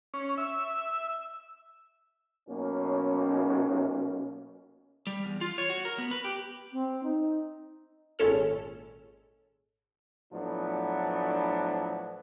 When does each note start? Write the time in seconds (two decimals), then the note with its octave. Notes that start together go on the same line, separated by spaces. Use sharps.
0.14 C#4
0.38 E5
2.48 B1 A#3 C#4
5.07 G3
5.25 E2
5.41 F4
5.58 C#5
5.70 F#4
5.85 A#4
5.98 B3
6.11 B4
6.24 G4
6.72 C4
7.03 D#4
8.19 G#1 A#2 G#3 C#4 A4 F6
10.32 A2 F3 F#3 B3 D4